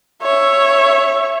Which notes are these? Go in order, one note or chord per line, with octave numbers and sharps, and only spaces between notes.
C#5 E5